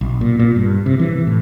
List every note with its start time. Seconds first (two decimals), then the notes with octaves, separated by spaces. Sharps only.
0.01 B1
0.21 A#2
0.39 A#2
0.56 G2
0.86 C3
0.99 E3
1.27 A2